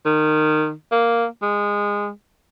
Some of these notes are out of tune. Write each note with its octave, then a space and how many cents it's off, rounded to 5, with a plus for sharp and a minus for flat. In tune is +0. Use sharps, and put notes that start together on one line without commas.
D#3 -20
A#3 +0
G#3 -20